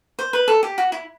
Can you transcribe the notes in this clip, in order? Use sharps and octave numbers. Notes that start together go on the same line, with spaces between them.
C5
B4
A4
G4
F#4
E4